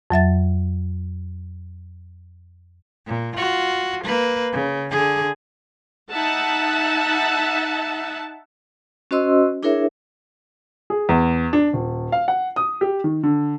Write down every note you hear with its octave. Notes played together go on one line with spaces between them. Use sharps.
F2 F#3 E5 A6
A#2
F4 F#4
A#3 B4
C#3
D3 G#4
D#4 E5 F#5 A5
C#4 F#4 C5 D#5 C6 E6
D4 E4 G#4 A#4 C#5 E5
G#4
E2
D4
D#1
F5
F#5
D#6
G4
D#3
D3